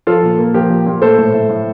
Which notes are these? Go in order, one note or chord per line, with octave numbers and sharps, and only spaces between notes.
F3 F4 A4
A#2
A#3
F3 G4 A#4
A#2
A#2
A3 A4 C5
A2
A2
A2